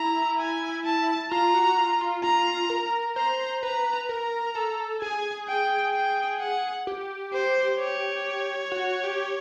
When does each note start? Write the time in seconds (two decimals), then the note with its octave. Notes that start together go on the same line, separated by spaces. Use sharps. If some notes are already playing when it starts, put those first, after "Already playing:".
Already playing: E4 A#5
0.39 G#5
0.85 A5
1.31 F4 A#5
1.54 F#4
1.77 F4
2.01 F4
2.23 F4 A#5
2.70 A#4
3.16 C5 A#5
3.63 B4 A#5
4.09 A#4 A#5
4.55 A4
5.01 G#4 G#5
5.48 G5
5.94 G5
6.41 F#5
6.87 G4
7.33 C5
7.79 C#5
8.72 F#4
9.03 G4